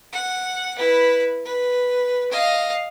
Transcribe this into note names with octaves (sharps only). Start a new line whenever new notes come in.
F#5
E4 B4
B4
D#5 F5